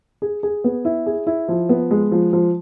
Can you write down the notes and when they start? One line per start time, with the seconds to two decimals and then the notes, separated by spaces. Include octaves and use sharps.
0.22 G#4
0.43 G#4
0.64 B3
0.85 E4
1.06 G#4
1.27 E4
1.48 F3
1.69 B3
1.91 G#3
2.12 F3
2.33 F3